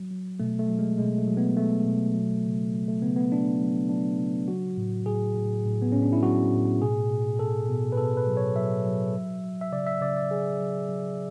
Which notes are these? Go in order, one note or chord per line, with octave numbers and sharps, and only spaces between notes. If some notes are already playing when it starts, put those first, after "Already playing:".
Already playing: F#3
F#3
B2 A3
A3
F#3
G#3
B2 G#3
A3
F#3
B3
F#3 A3
B2
F#3
C#3
F#3
A3
C#3 B3
B3
F#3 D4
F#3
F#3 D4
C#3
F#3 F#4
A2
A2 G#4
A2
A2
B3
A2 C#4
D4
E4
F#3 F#4
A2
B2 G#4
B2
B2 A4
B2
B4
B2 A4
B4
F#3
C#5
F#3 E5
F#3
F#3
F#3
E5
C#3 D5
E5
C#3 D5
D5
F#3 G#4
F#3
F#3